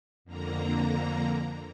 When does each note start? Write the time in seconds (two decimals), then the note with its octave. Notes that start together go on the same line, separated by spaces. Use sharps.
0.25 F2 D3 A#3 A#5